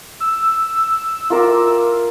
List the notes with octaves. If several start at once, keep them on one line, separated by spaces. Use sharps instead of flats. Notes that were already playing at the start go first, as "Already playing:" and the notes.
E6
F4 A#4 D6